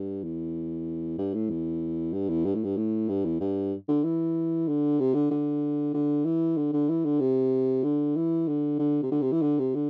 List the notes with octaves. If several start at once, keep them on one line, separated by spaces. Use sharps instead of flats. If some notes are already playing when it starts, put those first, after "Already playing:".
Already playing: G2
E2
G2
A2
E2
G2
E2
G2
A2
G2
A2
G2
E2
G2
D3
E3
D3
C3
D3
D3
D3
E3
D3
D3
E3
D3
C3
D3
E3
D3
D3
C3
D3
C3
E3
D3
C3
D3